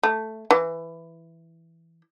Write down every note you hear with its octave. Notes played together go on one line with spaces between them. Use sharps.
A3
E3